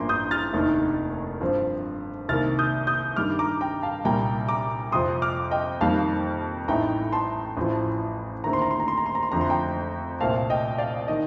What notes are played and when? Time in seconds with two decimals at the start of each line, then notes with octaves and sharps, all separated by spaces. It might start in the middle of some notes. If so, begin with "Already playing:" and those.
Already playing: A1 G2 F3 A#3 A#5 C6 D6
0.09 D#6 G6
0.31 F6 A6
0.53 F1 D#2 D#3 A3 D4
1.41 G2 F3 C4
2.29 C2 C3 D#3 A#3 F6 A6
2.59 D#6 G6
2.87 D#6 G6
3.16 G2 D#3 G3 D6 F6
3.39 A#5 D6
3.61 G5 A#5
3.83 F5 A5
4.04 C2 A#2 G3 G5 A#5
4.49 A#5 D6
4.92 F2 C3 F3 C6 D#6
5.22 D6 F6
5.51 D#5 G5
5.81 F2 D#3 G3 A#3 F5 A5
6.68 A1 A2 A3 D#4 G5 A#5
7.12 A5 C6
7.57 A1 A2 F3
8.44 D#2 D3 A3 C4 A#5
8.53 C6
8.62 A#5
8.71 C6
8.80 A#5
8.88 C6
8.97 A#5
9.06 C6
9.15 A#5
9.23 C6
9.32 F2 D3 F3 A3 A#5
9.41 C6
9.50 G5 A#5
10.20 C2 A#2 A3 C4 F5 A5
10.50 D#5 G5
10.78 D5 F5
11.08 D#3 D#5